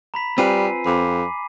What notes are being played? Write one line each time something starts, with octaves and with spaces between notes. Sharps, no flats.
A#5 B5 B6
G3 C4 F4 B4 G#5 C7 D#7
F2 B5 D6 B6